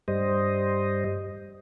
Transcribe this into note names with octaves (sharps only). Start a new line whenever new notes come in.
G2 G3 C5 D#5